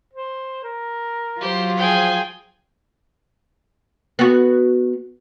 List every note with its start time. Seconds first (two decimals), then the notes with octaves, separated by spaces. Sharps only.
0.13 C5
0.64 A#4
1.40 F#3 F4 G4 C5
1.78 F3 G#4 C5 G5 G#5
4.19 B3 F#4